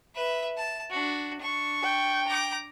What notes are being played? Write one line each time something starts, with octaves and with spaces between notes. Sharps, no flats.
B4 E5
A5
D4 F#4
D4 C#6
G5
A#5 D6